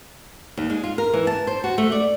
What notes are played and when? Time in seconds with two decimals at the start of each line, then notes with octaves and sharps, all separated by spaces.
0.57 D#2
0.70 G#3
0.84 F4
0.98 A#4
1.14 E3
1.27 A5
1.47 C5
1.64 F#4
1.78 A3
1.92 D5